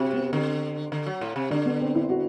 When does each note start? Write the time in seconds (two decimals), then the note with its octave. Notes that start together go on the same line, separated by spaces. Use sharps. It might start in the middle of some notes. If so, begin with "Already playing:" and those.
Already playing: C3 C4 F#4 G4
0.13 B3
0.33 D3 C4
0.92 D3
1.06 F#3
1.21 A2
1.36 C3
1.50 D3 D4
1.66 B3
1.80 C4
1.95 E4
2.09 F#4